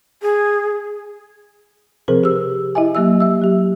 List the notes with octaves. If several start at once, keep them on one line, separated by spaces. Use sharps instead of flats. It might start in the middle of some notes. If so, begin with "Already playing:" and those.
G#4
C3 F3 C4 G#4 A#4 C5
G4 E6
E4 D#5 E5 G#5
F#3 A#3 G4 D#5 E5 E6
E5 E6
F#3 G4